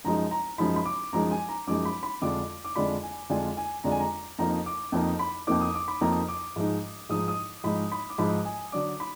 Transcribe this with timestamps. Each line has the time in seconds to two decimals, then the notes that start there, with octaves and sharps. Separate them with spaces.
0.04 F#2 F3 G#3 D#4 A#5
0.31 A#5
0.58 F#2 F3 G#3 D#4 B5
0.76 B5
0.85 D6
1.13 F#2 F3 G#3 D#4 A#5
1.31 G#5
1.49 A#5
1.67 F#2 F3 G#3 D#4 D6
1.85 B5
2.03 B5
2.22 F2 D3 G#3 D4 F4 D6
2.64 D6
2.76 F2 D3 G#3 D4 F4 B5
3.03 G#5
3.30 F2 D3 G#3 D4 F4 G#5
3.57 G#5
3.84 F2 D3 G#3 D4 F4 A#5
3.92 G#5
4.00 A#5
4.39 F2 F3 A#3 D#4 A#5
4.66 D6
4.92 F2 F3 A#3 D#4
5.19 B5
5.47 F2 F3 A#3 D#4 D6
5.61 D#6
5.75 D6
5.88 B5
6.01 F2 F3 A#3 D#4 A#5
6.28 D6
6.56 G#2 F3 G#3 D#4
7.10 G#2 F3 G#3 D#4 D#6
7.28 D#6
7.64 G#2 F3 G#3 D#4 B5
7.92 B5
8.10 D6
8.18 G#2 F3 G#3 D#4 B5
8.45 G#5
8.72 D3 F#3 D4 D6
9.00 B5